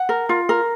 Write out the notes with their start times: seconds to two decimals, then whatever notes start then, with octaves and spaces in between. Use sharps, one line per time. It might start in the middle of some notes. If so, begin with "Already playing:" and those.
Already playing: F#5
0.09 A#4
0.29 F4
0.49 A#4